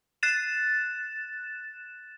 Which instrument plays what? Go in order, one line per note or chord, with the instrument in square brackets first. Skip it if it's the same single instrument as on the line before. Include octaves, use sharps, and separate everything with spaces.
[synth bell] F#6 A6 E7